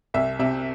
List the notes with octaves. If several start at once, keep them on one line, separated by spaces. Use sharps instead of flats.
C2 E5
C3 E5